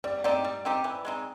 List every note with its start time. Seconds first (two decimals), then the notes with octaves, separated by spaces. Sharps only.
0.04 G3 D5
0.24 C4 D#4 G4 D5
0.45 G3
0.65 C4 D#4 G4
0.84 E3
1.05 G#3 C4 D#4